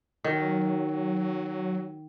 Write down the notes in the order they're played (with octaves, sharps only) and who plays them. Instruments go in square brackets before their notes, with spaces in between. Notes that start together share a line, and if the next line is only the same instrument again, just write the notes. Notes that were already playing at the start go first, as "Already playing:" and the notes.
[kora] D#3 [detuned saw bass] F#3